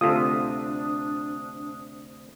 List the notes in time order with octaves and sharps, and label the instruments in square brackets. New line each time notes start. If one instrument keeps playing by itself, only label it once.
[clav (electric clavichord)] D2 C3 [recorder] D4 [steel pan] F4 A4 [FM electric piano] D#6